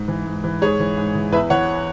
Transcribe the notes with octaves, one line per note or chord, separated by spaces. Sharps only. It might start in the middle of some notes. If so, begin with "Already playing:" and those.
Already playing: G#2
E3
G#2
E3
G#2 G#4 C#5
E3
G#2
E3
E2 B4 E5
E3 C#5 F#5